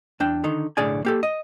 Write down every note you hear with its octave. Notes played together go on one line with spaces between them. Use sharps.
E2 D4 G5
D3 D#3 D#4
B1 A2 D3 G#4 D5 G#5
A#3 G4 A4
D#5